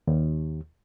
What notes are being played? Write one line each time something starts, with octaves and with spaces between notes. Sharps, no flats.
D#2